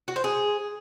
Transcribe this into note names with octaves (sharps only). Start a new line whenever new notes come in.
F#4
C5
G#4